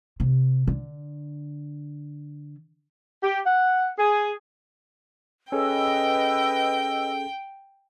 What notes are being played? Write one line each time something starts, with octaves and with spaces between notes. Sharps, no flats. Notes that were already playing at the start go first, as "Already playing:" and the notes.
C3
D3
G4
F#5
G#4
C#4 G#4 A4 B4 D#5 G5 E6